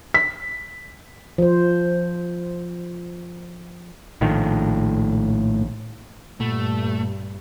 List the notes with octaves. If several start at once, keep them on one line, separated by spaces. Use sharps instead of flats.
B6
F3 C5
A#1 A2 D#3 F3
G2 A#2 A3